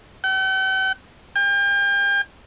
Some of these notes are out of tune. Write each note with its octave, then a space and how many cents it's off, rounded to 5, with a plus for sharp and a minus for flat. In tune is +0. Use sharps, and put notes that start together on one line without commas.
G5 -45
G5 +40